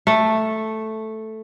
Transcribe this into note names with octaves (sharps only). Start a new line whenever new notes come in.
A3